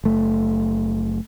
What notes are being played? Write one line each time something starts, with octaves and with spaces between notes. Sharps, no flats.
F#1 A3